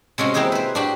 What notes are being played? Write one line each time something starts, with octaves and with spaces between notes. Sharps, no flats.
C3 G#3 C#4 F#4
A#3 C4 E4 G#4 C5 D#5
B4 C5
D4 F#4 G4